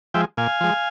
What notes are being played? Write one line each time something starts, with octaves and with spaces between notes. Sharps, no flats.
F3 G#3 E5 G5
A#2 F5 G#5
F3 G#3